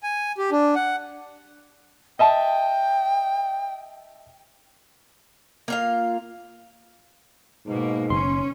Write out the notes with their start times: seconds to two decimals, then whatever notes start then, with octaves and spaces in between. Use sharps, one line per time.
0.03 G#5
0.38 G4
0.51 D4
0.75 F#5
2.19 D#5 E5 G5 A5
5.68 A#3 F4 F5
7.67 G#2 B2 A#3
8.10 F#1 C#4 C6